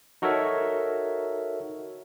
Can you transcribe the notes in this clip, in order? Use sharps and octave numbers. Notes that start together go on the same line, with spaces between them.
D#4 F#4 A4 A#4 C#5 E5